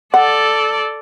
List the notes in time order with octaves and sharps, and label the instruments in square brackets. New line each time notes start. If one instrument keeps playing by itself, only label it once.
[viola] A4 D5 [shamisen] F#5